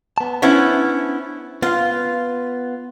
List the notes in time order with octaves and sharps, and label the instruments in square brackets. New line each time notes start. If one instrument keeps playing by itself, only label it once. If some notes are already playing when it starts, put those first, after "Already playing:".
[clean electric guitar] B3 A5
[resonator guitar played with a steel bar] B3 C#4 E4 [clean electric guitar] D4 C5
[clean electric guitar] B3 B4 F5 [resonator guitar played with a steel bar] F4